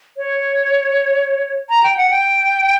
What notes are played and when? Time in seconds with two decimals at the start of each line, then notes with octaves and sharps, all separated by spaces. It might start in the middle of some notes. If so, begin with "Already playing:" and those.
0.17 C#5
1.69 A#5
1.84 G5
1.97 F#5
2.10 G5